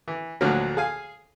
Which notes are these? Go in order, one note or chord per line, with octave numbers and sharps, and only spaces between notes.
E3
D2 A2 D3 F3 F#3 A#3
G#4 F5 G#5